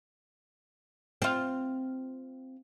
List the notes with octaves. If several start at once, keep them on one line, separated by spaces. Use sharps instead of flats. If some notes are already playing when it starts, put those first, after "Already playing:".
C4 F4